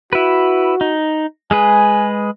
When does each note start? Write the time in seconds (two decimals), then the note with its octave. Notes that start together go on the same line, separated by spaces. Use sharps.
0.13 E4 F#4 B4
0.81 D#4
1.51 G#3 G#4 B4 G#5